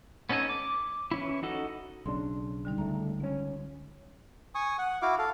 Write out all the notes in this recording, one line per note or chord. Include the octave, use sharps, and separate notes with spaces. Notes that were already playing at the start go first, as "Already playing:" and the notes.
B3 C#4 D#4 A4 G#5
D6
E3 C#4 E4
D#4 F#4 A4
B1 C#3 D4 C6
D3 G3 D#4
C#2 A3 A#5
C#2 C#4
G#5 C#6 D#6
F#5
E4 F#4 F5 D6
A4 F5